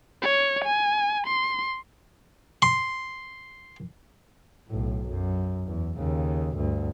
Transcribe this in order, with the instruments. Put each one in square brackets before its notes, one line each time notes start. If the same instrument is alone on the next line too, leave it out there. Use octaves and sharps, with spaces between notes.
[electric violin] C#5
G#5
C6
[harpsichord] C6
[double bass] B1 A2
F#2
E2
D#2 C#3
D2 G2